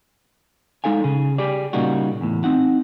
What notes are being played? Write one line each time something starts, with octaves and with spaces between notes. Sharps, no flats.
G#3 D#4 A4 F5 G#5
C#3 G#4
G4 G#4 D5
A#2 C#3 G3 A#3 D#4 F#4
E2 A2
C4 D#4 F#5